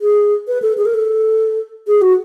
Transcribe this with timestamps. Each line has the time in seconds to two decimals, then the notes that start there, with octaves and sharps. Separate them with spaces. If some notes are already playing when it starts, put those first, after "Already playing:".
0.01 G#4
0.48 B4
0.62 A4
0.77 G#4
0.86 A#4
0.94 A4
1.87 G#4
2.02 F#4